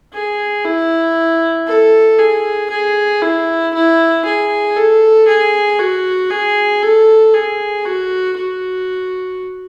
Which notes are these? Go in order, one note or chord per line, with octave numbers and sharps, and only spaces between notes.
G#4
E4
A4
G#4
G#4
E4
E4
G#4
A4
G#4
F#4
G#4
A4
G#4
F#4
F#4